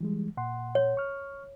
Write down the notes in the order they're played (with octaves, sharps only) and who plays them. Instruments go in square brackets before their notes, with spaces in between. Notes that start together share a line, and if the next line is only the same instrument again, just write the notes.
[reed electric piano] E3 G3 G#3
A#2 F#5 C6
[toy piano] C#5
[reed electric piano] C#6 F6